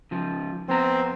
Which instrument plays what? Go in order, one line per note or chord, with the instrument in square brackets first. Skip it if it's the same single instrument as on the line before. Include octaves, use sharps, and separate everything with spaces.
[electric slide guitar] C#3 F3
[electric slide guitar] F2 B3 A#5 [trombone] C4